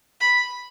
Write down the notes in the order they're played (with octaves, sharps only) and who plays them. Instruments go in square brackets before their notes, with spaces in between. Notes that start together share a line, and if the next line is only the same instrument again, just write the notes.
[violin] B5